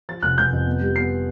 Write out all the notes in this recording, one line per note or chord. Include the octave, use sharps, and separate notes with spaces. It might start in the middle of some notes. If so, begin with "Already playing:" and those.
F3 A6
F1 F#6
F1 G6
F2
B3
G3
B3 C7